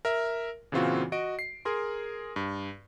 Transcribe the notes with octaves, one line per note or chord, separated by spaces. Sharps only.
A#4 E5
A#2 C#3 E3 C4 F4 F#4
F#4 D#5 D7
C7
G#4 A#4 C6
G2